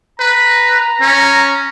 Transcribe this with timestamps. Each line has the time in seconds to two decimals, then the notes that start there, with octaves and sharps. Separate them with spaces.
0.20 B4 A#5
1.01 C#4